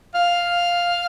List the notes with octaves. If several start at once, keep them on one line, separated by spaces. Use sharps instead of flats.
F5